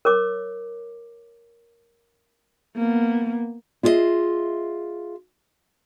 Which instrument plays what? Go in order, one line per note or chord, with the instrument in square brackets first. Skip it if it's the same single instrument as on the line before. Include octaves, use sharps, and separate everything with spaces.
[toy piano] A#4 C#5 D6
[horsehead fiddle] A#3 B3
[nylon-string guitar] E4 F4 G#4 A4 D#5 E5